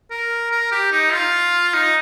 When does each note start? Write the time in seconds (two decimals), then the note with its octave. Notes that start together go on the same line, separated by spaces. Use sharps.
0.11 A#4
0.51 A#4
0.72 G4
0.92 D#4
1.13 F4
1.74 D#4